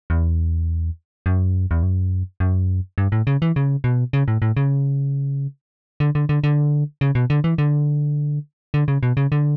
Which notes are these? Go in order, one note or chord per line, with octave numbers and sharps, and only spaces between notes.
E2
F#2
E2
F#2
F#2
G2
A2
C#3
E3
C#3
B2
C#3
A2
A2
C#3
D3
D3
D3
D3
C#3
B2
D3
E3
D3
D3
C#3
B2
C#3
D3